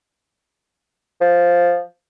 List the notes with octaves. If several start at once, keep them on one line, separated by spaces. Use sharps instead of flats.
F3